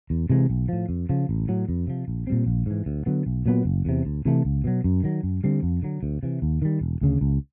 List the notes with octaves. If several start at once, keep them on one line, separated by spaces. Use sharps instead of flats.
E2
C3 E3 G#3
B1
A2 F3
F2
C#3 F3
A1
A2 F#3
F2
C3 F3
A#1
A#2 G3 C4
A#1
G#2 E3
D2
D3 F#3 B3
B1
A#2 F#3 B3
F#1
E2 C3
D2
C3 E3 A3
C#2
B2 F#3
F#2
D#3 F#3
F#2
D3 G3 C4
F2
D3 F#3
D2
C3 E3
D#2
D#3 G3
E1
D2 C#3
C#2